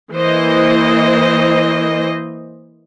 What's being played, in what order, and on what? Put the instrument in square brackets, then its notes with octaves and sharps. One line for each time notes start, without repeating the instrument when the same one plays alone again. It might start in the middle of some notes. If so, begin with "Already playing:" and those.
[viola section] E3 A#3 C5 D#5